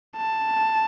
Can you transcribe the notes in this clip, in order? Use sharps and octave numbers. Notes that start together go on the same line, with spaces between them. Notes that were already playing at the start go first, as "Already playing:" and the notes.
A5